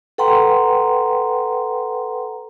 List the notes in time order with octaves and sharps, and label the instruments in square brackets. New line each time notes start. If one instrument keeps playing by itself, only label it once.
[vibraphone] A4 B4 F#5 G5 A#5 C6